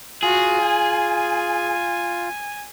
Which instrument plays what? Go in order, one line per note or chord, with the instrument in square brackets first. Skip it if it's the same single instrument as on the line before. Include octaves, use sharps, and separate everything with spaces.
[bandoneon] F4 [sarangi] F#4 [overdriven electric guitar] G#4
[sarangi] G#5